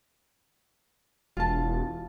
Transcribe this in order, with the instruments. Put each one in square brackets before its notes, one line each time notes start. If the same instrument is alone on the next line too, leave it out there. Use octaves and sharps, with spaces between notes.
[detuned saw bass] E1 [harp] F4 A5